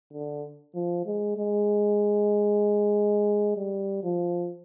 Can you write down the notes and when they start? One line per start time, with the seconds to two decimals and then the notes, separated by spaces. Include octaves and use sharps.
0.12 D3
0.75 F3
1.06 G#3
1.37 G#3
3.57 G3
4.04 F3